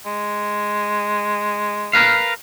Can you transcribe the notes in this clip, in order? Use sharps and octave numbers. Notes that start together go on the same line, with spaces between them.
G#3
A#4 B4 F5